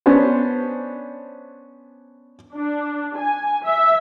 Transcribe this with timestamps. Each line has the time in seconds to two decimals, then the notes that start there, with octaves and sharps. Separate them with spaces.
0.06 B3 C#4 D4 C5
2.55 D4
3.18 G#5
3.66 E5